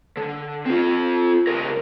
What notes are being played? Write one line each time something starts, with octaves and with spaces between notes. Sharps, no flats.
D3
C4 F4
C#2 A#4